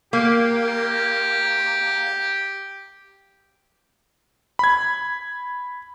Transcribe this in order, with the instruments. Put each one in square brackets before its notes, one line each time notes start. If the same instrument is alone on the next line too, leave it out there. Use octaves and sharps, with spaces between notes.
[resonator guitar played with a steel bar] A#3 [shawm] G4
[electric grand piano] B5 G#6